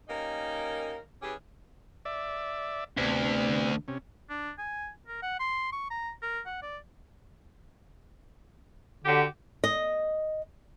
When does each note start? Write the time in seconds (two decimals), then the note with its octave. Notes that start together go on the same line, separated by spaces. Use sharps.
0.09 A#3 C#4 D#4 G4 A#4
1.22 E3 C#4 G4 G#4
2.05 D5 E5
2.98 D2 C3 B3
3.88 C3 C#4
4.30 D4
4.58 G#5
5.07 A#4
5.22 F#5
5.40 C6
5.72 C#6
5.91 A#5
6.22 A#4
6.46 F#5
6.63 D5
9.04 D3 F#4 G4
9.64 D#5